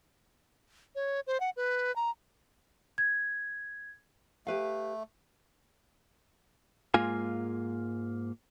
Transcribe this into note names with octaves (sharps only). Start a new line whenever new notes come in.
C#5
C5
F#5
B4
A#5
G#6
A3 G4 B4 F5
G#2 G#3 A#3 F4 G#5